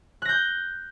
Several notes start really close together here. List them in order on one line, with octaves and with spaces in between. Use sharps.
F#6 A#6 G6